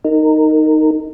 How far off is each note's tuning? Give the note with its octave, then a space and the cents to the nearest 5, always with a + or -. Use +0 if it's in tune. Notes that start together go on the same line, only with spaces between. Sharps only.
D#4 +0 A#4 -20